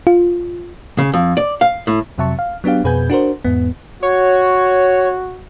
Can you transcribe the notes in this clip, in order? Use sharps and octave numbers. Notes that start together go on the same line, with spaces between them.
F4
C#3
F2
D5
F5
A2
F2 C3 F#3 E5 A5 C#6
F5
F#3 B3 D4 G4 F5
F2 B2 G#4 B4 G#5 G6
D4 F#4 A#4 C5
E2 G#2 B3
F#4 C#5